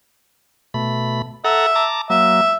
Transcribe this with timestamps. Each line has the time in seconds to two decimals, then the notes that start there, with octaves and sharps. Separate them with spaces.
0.74 B2 A3 B5
1.44 A4 E5 F#5 A#5
1.75 A5 A#5 D6
2.10 F#3 A#3 E5